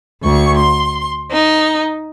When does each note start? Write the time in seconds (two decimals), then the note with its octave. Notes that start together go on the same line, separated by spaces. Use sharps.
0.22 D2 C#6
0.57 C6
1.31 D#4